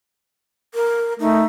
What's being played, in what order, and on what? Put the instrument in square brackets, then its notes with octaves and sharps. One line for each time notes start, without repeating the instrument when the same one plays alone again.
[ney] A#4
[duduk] A3 [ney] D#4